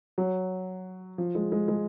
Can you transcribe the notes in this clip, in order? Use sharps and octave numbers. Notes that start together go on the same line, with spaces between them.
F#3
F3
G#3
G#3
G#3